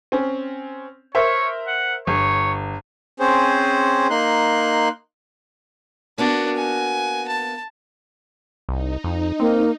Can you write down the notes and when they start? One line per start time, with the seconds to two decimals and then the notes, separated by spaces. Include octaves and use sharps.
0.12 C4 C#4
1.15 A#4 C5 C#5 E5
1.67 F#5
2.07 G1 C#5
3.20 C4 C#4 G#4 C5
4.10 A#3 D#4 C6 F#6
6.18 A#3 B3 D4 F#4 F#5
6.55 G#5
7.28 A5
8.69 C2 D#4
9.04 F2
9.40 A#3 C4